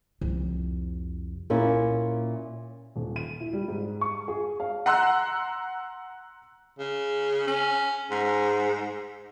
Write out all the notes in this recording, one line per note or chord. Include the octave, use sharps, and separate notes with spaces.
C2 F2
A#2 A#3 C#4 E4
D#1
D#7
E4
G3
G#2
C#6
G#4
F5
F#5 A#5 C6 E6 F#6
C#3
C#4
G#2